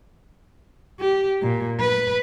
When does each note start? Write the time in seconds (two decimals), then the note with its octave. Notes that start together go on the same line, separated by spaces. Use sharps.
1.00 G4
1.42 A#2
1.80 B4